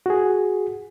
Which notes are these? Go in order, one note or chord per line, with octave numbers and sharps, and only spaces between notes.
F#4 G#4